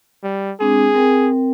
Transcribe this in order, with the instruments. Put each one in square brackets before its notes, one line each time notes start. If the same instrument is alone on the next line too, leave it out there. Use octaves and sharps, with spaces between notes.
[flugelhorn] G3
[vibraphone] G#3 C4 D4 [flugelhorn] G#4
[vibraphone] C4 A#4 G5